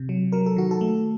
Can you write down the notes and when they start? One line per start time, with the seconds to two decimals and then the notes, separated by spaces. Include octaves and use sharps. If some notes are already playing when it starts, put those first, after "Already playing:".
Already playing: C3
0.09 F#3
0.32 F#3 A#4
0.46 A4
0.56 D#3 F#4
0.71 A4
0.81 A3